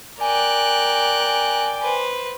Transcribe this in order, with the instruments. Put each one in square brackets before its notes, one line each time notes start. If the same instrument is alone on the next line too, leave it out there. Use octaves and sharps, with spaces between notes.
[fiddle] A#4 F#6 [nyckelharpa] D5 G5 [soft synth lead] G#5
[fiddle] B4 C5